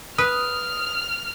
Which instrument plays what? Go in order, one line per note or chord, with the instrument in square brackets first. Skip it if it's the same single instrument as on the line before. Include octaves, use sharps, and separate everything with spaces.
[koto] B4 [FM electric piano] D#6 [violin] F6